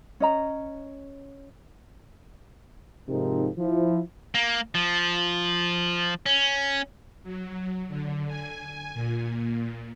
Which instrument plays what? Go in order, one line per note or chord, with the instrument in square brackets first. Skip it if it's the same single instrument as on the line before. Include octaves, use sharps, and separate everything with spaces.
[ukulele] C#4 D#5 A#5
[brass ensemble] G#2 C3 F3 C4 D#4 A#4
F3 E4
[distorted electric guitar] A#3
F3
C#4
[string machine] F#3
D3
G#5
A#2